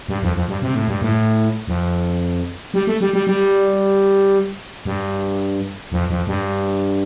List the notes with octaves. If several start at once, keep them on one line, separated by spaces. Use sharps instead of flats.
G2
F2
F2
G2
C3
A2
G2
A2
F2
G3
A3
G3
G3
G3
G2
F2
F2
G2